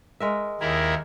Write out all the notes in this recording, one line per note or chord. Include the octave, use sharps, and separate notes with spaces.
G#3 A#4 E5
D#2 E4 G#4 A#4